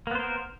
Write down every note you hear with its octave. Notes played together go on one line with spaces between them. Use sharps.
A#3 B3 A#4 C5